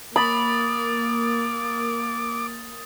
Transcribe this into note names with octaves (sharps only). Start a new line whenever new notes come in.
A#3 B5 D6 D#6 A6